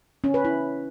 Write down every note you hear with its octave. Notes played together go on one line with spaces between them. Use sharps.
C#4
B4
E4